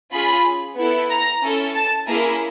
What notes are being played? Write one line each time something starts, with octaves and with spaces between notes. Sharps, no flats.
C#4 F4 G#4 B5
B3 E4 A4
A#5
C#4 E4 A4
A5
A#3 C#4 E4 G#4 A#5